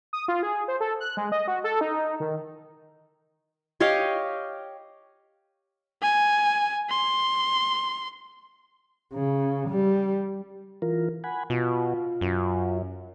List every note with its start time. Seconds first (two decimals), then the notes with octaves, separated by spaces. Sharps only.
0.13 D#6
0.28 F4
0.43 G#4
0.68 C5
0.80 A4
1.00 F#6
1.17 G#3
1.32 D#5
1.48 F#4
1.64 A4
1.81 D#4
2.20 D#3
3.80 G4 C#5 D#5 F5
6.02 G#5
6.89 C6
9.14 C#3
9.69 G3
10.82 E3 F4 A#4
11.24 F#5 G#5 B5
11.50 B2 F4
12.21 F#2